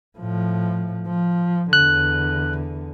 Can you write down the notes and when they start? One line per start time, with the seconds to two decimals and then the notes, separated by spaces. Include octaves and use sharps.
0.18 A2 F3
1.06 F3
1.73 E2 D3 F#6